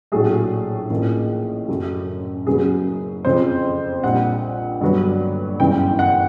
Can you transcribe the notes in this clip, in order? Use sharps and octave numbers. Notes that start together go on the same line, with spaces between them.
A#1 A2 F#3 A3 G#4
A1 A2 F3 A#3
F#2 C#3 F#3 A3
F#1 F#2 C#3 F#3 B3 G#4
F2 C#3 F3 C5
A#1 A#2 G3 F#5
G2 D3 F#3 B3
G1 F#2 C#3 E3 G5
F#5